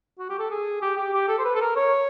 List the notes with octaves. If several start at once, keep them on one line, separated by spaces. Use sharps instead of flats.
F#4
G4
A4
G#4
G4
G4
G4
A4
C5
B4
A4
A#4
C#5